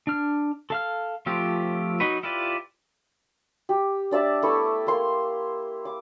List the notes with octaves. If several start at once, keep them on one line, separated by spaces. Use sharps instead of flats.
D4 F6
A4 F5 F6
F3 A3 C4 F4 G4
F#3 D#4 F#4 B4
E4 F4 G4 B4 D5
G4
D4 D5 E5 A5
A3 B3 E4 C#6
A#3 C6
D6